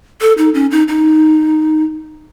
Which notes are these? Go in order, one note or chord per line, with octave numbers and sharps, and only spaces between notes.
A4
D#4
C#4
D#4
D#4